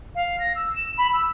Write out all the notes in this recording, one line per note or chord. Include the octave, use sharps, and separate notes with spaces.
F5
A#6
E6
E7
B5
E6